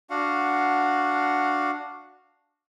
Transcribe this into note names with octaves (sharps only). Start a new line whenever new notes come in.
D4 F#4 F5 F#5